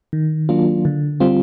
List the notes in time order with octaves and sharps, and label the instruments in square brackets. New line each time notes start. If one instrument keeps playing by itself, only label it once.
[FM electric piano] D#3
F#3 A#3 D4 F4
D3
G3 C4 F4